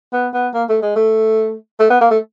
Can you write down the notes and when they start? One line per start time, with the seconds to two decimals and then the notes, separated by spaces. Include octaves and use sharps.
0.13 B3
0.33 B3
0.54 A#3
0.69 A3
0.82 G#3
0.96 A3
1.80 A3
1.90 B3
2.01 A#3
2.10 A3